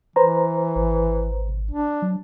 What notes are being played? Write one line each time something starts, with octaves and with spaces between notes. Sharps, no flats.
E3 B4 C5 A#5
G#1
D4
F#3